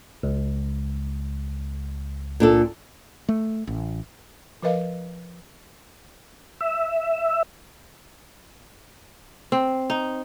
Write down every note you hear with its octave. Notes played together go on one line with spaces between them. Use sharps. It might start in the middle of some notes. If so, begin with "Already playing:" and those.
C#2
A#2 D4 A4
A3
A1
F3 A#4 B4 D#5 F5
E5
C4
D#4